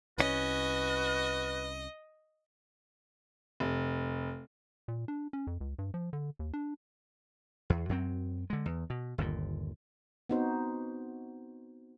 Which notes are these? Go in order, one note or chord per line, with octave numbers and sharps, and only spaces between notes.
C2 E3 C#4 F#4 B4 D#5
F1
A#2
D4
C#4
F2
C#2
G2
F3
D3
D#2
D4
E2
F#2 F#3 C4
D3 G#3
E2
B2
G1 D#2 A#2
B3 C4 D#4 F#4 C5